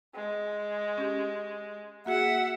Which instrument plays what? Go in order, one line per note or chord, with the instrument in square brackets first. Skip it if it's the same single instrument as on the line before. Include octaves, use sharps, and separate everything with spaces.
[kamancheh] G#3
[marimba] C#4 G4
[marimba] A#3 F#4 G#4 [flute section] E5 F#5